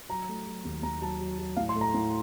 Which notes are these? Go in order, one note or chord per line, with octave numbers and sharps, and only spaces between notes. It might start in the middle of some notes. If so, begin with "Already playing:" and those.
F#3 A#5
A3
F#3
D#2
D#2 A#5
F#3 A5
F#3
F#3
A2 F5
C6
A3
A#5
A2